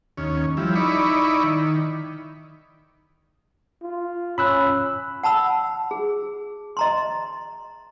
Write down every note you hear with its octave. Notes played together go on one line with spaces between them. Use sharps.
D#2 C#4
F3 G3 E4
D#4 E4 D5 B5 C#6
D#3
F4
C#4 B5 E6 F#6
F#5 A5 B5 E6
G#4
D#5 A#5 C6